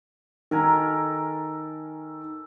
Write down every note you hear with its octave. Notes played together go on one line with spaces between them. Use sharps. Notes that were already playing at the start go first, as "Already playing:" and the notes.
D#3 A4 A#4 G#5